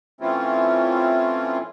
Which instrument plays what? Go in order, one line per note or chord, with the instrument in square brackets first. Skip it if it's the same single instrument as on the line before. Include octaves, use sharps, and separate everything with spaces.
[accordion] E3 A3 C4 C#4 E4 F4